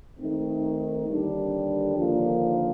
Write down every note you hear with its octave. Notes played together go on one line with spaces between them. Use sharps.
D#3 A3 C4 D#4
D#2 D3 G3 D4
D#2 D3 F3 A#3 F4